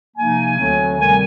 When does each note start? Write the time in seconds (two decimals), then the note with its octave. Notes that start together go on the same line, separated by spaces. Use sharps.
0.16 C3 F3 A#3 D#4 G#5
0.57 D2 D3 F#3 A3 C4
0.99 C3 D#3 G3 C4 G#5